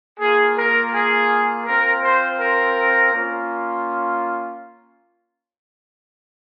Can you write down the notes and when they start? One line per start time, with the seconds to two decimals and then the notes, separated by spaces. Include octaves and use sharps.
0.20 A#3 F4 G#4
0.57 A#4
0.93 G#4
1.66 C4 F4 A#4
2.03 C5
2.39 A#4
3.12 A#3 C#4 F4